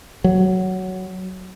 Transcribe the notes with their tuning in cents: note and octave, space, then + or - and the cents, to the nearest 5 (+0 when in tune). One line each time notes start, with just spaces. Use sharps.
F#3 +10